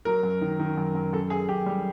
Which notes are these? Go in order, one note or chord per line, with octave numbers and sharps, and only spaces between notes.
F#3 A#4
F#2
D#3
D#3
F#2
F#2
F#2 A4
F#2 G#4
F#2 G4
G3